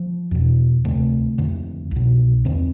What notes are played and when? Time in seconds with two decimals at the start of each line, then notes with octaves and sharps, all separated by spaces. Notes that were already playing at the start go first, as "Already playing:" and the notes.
Already playing: F3
0.31 E2 B2
0.85 D2 C3 A3
1.38 F2 D3
1.91 C2 B2
2.45 E2 D3 C4